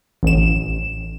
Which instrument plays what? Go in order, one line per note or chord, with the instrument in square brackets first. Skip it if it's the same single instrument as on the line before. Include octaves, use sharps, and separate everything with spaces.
[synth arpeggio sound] A1 E7